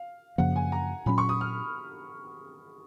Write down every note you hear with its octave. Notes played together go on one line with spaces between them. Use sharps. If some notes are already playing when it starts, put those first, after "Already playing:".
Already playing: F5
F#2 C#3 F3 A#3 F#5
G#5
A#5
A#2 F#3 C#4 B5
C#6
D#6
F6